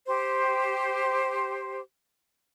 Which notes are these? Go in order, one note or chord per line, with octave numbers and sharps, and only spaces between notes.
G4 C5